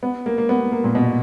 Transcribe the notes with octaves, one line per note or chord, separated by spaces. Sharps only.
B3
A#3
A#3
B3
A#3
A#2
B2